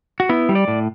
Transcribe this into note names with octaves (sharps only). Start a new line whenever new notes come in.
F#4
B3 E4
G3
D5
A2